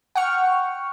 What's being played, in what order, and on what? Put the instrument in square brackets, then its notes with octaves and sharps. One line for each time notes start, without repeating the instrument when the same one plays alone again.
[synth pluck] F#5 G5 C#6 F6